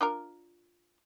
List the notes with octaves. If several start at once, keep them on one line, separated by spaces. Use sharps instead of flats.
D4 F4 A#4